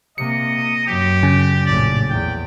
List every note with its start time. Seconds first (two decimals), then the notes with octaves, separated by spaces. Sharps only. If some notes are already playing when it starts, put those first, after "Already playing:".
0.18 C3 A#3 D#5 C#7
0.87 F#2 G4
1.23 C#3
1.66 A#1 A2 D5
2.10 E2 G5